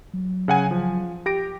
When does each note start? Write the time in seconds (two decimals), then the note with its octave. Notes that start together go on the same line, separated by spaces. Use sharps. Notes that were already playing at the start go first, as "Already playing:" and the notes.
0.13 F#3
0.48 C#3 F#5 G#5
0.71 F3
1.26 G4 A#6 D7